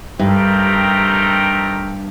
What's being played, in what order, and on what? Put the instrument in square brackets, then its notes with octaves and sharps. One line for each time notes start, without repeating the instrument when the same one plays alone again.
[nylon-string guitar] G2 [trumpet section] A3 C4 D#4 G4 A#4